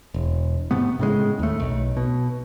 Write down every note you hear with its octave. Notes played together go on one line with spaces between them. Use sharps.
E1
G#2 C3 A3 B3
A2 C#3 G#3
D#2 A3
B1
B2